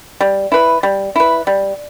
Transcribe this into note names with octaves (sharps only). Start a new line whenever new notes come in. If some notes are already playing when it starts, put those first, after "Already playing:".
G3
E4 B4
G3
E4 B4
G3